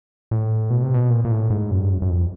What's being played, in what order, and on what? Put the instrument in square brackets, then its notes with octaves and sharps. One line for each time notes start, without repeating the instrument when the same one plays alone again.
[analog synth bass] A2
B2
C3
B2
A#2
A#2
A2
G#2
F#2
G2
F#2
F#2
F2